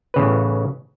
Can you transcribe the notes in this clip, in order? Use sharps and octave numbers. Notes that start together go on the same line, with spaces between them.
A1 C#3 B4